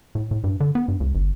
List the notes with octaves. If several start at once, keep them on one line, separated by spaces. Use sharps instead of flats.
A2
A2
G2
D3
B3
G2
C#2
G1